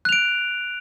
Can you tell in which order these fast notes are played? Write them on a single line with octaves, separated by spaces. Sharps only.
F#6 F7 D7